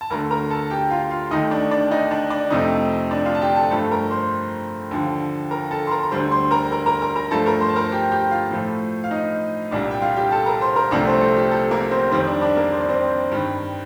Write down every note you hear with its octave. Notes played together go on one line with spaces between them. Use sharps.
A5
D2 D3 A3 A#4 A#5
A#4 A#5
A4 A5
G4 G5
F4 F5
F4 F5
D#2 D#3 A3 D#4 D#5
D4 D5
D4 D5
D#4 D#5
D4 D5
D4 D5
F2 C3 F3 A3 D#4 D#5
D4 D5
F4 F5
A5
G4 G5
A4 A5
G2 F3 A3 A4 A5
A#4 A#5
C5 C6
D#2 D3 F3
A#4 A#5
A4 A5
C6
A#4 A#5
A#5
D2 D3 G3 C5 C6
C5 C6
A#4 A#5
A#4 A#5
A#4 A#5
A#4 A#5
A#4 A#5
G2 F3 A3 A4 A5
A#4 A#5
C5 C6
A5
A#4 A#5
G4 G5
G4 G5
F4 F5
A2 F3 A3
F5
D#4 D#5
C2 A#2 G3 D4 D5
G5
F4 F5
G4 G5
A4 A5
A#4 A#5
C5 C6
A#4 A#5
C2 C3 F3 A3 D4 D5
C4 C5
A4
G4
A4
A#3 A#4
C4 C5
F2 D#3 G3 C4 C5
D4 D5
D4 D5
A#3 A#4
C5
D5
C4 C5
G2 D#3 G3